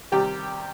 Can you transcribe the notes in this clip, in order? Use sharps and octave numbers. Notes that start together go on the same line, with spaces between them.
C3 D#3 G3 G4